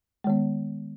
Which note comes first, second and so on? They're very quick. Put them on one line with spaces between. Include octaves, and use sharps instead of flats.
G#3 D#3 B3